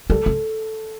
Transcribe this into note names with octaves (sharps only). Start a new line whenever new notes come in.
G3 A4
C4